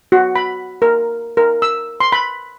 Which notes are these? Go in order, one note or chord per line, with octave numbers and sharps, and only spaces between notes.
F#4
B5
A#4
A#4
E6
C6
B5